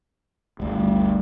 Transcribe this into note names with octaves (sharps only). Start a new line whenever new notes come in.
G1 D2 G3